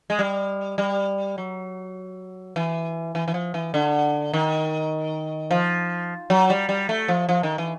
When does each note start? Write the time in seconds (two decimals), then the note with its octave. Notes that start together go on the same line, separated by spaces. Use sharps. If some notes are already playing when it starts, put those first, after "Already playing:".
0.10 G#3
0.19 G3
0.78 G3
1.38 F#3
2.56 E3
3.15 E3
3.28 E3
3.34 F3
3.54 E3
3.74 D3
4.33 D#3
5.51 F3
6.30 F#3
6.50 G3
6.69 G3
6.89 A3
7.08 F3
7.29 F3
7.43 D#3
7.58 E3